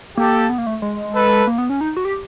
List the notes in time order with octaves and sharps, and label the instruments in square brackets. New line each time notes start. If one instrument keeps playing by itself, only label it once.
[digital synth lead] A#3 [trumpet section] G4 A4
[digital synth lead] B3
A#3
A3
G#3
[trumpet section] A4 B4
[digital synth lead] A#3
B3
C#4
D#4
F#4
G4